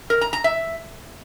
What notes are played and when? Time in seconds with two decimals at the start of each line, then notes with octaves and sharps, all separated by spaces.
0.10 A#4
0.21 A#5
0.33 A#5
0.44 E5